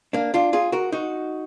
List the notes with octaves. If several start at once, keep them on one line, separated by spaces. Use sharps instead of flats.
A#3 D4
D4 F4
F4 G#4
F#4 A#4
D#4 F#4